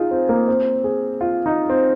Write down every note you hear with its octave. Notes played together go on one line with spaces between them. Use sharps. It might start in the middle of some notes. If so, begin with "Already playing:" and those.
Already playing: D#4 F4 G#4
C4
A#3
C4
G#4
F4
D#4
C4